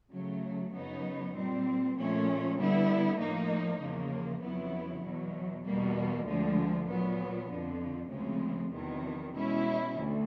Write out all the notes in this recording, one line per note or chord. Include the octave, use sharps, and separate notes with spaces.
C#3 F#3 A3
F#2 C#3 F#3 B3 D#4
A#2 G3 C4
A#2 F3 A3 C#4
D3 G3 B3 E4
A2 F3 A#3 D#4
E2 C#3 F3 A#3
F2 C#3 F#3 B3 E4
E2 B2 F#3
E2 B2 G3 A#3
D2 D3 F3 G#3
A#2 F#3 B3
F2 D3 F3
D2 C#3 F3 G#3 C4
E2 C3 D#3 F#3
B2 G#3 C#4 E4
D2